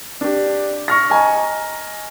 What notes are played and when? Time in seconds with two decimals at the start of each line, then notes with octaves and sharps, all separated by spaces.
0.21 D4 G4
0.88 C#6 F6 A#6
1.10 D#5 G#5 A#5